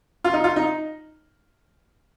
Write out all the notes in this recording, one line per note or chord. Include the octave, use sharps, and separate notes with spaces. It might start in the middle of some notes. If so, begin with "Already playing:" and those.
F4
D#4
F4
D#4